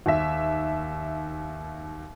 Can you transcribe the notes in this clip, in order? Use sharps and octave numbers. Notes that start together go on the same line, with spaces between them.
D#2 E5